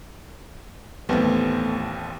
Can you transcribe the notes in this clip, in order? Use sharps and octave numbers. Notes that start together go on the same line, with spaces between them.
A1 D#2 A3 B3 C4